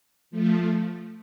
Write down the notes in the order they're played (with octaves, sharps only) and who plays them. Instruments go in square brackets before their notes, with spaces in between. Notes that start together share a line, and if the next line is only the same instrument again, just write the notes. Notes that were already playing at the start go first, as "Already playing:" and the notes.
[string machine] F3 A3